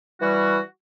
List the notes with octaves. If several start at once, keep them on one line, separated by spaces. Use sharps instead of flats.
E3 G3 F#4